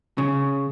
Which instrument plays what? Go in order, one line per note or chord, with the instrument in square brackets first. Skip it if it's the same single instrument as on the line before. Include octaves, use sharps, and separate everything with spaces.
[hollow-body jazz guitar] C#3